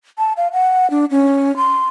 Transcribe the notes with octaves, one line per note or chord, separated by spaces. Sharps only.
A5
F5
F#5
D4
C#4
C6